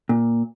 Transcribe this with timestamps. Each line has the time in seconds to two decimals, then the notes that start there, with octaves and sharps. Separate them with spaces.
0.09 A#2